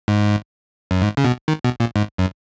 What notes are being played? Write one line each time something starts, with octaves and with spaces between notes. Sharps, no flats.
G#2
F#2
G#2
C#3
B2
D#3
B2
A#2
G#2
F#2